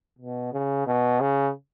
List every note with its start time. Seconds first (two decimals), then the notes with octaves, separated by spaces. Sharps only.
0.19 B2
0.53 C#3
0.87 B2
1.20 C#3